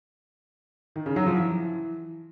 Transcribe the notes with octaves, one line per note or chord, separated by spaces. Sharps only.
D#3
C#3
F#3
F3
E3